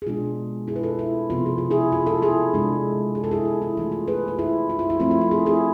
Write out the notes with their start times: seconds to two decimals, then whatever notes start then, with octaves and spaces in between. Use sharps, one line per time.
0.02 G#4
0.07 B2 G#3 D4 F4
0.68 E4 G#4
0.76 B4
0.83 F4 A4
0.99 E4
1.30 C3 F3 B3 F4
1.46 G#4
1.58 F4
1.71 E4 G#4
1.92 F4
2.06 F4 A4
2.22 E4 G#4
2.54 C3 G#3 D4
3.15 G#4
3.24 A4
3.31 E4 G#4
3.45 F4
3.62 E4
3.77 E3 A3 E4 F4
3.92 F4
4.07 G#4 B4
4.28 F4
4.39 E4 G#4
4.70 F4
4.79 E4
4.90 F4
4.99 F3 A3 C4 E4
5.11 F4
5.21 F4
5.31 E4 G#4
5.46 E4 G#4